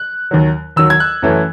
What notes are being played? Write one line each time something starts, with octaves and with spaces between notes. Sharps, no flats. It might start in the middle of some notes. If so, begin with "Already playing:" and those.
Already playing: F#6
D#2 D#3 F#3
D#2 D#3 F#3 E6
G#6
F#6
F#2 E3 A3 C#4